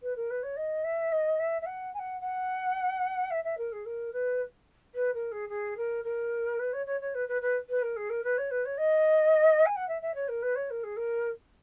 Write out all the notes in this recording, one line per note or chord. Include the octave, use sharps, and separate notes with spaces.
B4
A#4
B4
C#5
D#5
E5
D#5
E5
E5
F#5
G#5
F#5
F#5
E5
E5
A#4
G#4
A#4
B4
B4
A#4
G#4
G#4
A#4
A#4
B4
C#5
C#5
C#5
B4
B4
B4
B4
A#4
G#4
A#4
B4
C#5
B4
C#5
D#5
G#5
F#5
E5
E5
C#5
A#4
B4
C#5
A#4
G#4
A#4